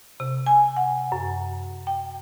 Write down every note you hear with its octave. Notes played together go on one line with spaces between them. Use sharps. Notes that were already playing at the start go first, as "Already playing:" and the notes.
C3
G#5
F#5
F#2
G5